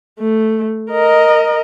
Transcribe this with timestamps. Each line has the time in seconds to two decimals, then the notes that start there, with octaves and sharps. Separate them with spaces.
0.19 A3
0.91 A#4 D#5